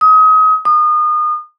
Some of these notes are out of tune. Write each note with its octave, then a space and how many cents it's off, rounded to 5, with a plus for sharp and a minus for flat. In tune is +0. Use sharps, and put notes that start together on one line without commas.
D#6 +30
D#6 -30